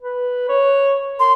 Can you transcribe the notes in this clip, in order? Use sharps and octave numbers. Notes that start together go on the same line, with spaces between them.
B4
C#5
A#4 C6